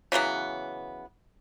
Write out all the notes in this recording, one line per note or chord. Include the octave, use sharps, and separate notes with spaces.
C#3 E3 F#3 B3